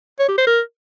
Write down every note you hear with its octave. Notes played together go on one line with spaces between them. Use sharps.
C#5
G4
C5
A#4